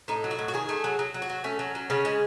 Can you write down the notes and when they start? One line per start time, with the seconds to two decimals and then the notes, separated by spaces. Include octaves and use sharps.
0.08 A2 D#4
0.24 F#3
0.31 F#4
0.39 A2
0.48 F#4
0.54 D#3 G#4
0.69 A3
0.84 F#3
0.99 F#3
1.14 F#3
1.22 F#4
1.29 F#3
1.44 A3 C#4
1.59 F#3
1.75 F#3
1.90 C#3 C#4
2.05 G#3